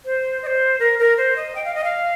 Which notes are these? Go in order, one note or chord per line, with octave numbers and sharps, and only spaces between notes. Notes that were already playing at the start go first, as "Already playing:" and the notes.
C5
D#5
C5
A#4
A#4
C5
D#5
G5
F5
D#5
F5